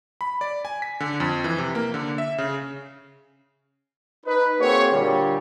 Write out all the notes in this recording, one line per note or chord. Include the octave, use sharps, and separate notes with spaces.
B5
D5
G#5
B6
D3
F2
E3
C3
A#3
D3
E5
C#3
D#4 B4
A#3 C4 F#4 G#4 C#5
A#2 D3 G3